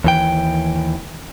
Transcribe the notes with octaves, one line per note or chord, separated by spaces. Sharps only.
D#2 E3 G5